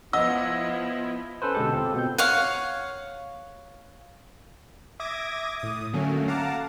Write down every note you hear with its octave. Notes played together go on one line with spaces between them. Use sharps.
F3 B3 E4 D#5 F#5 E6
C#4 A4 B4 C5
B2 D3 G#3 G4 A4
C4 F4 A4
B2 C4 G6
C#5 F5 F#5
E5 D6 D#6 G#6 A#6
A2 D#6
D3 F#3 A3 A#3 C#4
F5 F#5 A5 A#5 D6